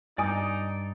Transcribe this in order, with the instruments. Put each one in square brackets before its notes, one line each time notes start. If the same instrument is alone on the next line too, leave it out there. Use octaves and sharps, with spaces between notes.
[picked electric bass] G2 [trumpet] D#4 [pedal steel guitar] D5 D6 [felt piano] G#5 D#6